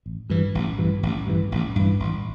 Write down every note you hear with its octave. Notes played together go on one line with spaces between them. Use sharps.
A1
G2 E3
A1
G2 E3
A1
G2 E3
A1
G2 E3
A1